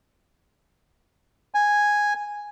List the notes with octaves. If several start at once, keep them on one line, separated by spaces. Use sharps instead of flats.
G#5